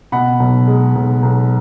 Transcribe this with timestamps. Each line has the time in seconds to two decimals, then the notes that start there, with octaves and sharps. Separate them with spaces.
0.12 B2 F#5 B5
0.40 B1
0.67 G#3
0.95 B1
1.23 B1